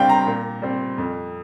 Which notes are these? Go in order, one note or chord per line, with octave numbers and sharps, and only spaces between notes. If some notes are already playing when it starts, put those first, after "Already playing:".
Already playing: G2 G3 C4 F5 G5
A#5
A#2
G3 C4
F2